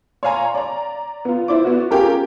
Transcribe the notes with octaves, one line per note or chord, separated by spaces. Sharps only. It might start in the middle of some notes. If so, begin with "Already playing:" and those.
C#5 D5 F5 G#5 A#5 C6
D5 A#5
B3 F4
E4 C5 D5 D6
B3 F#4
C#4 F4 G4 G#4 A#4